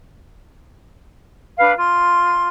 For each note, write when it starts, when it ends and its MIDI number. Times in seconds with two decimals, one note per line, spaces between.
1.59 1.73 62
1.59 1.73 71
1.59 1.73 77
1.59 1.73 83
1.77 2.48 65
1.77 2.48 84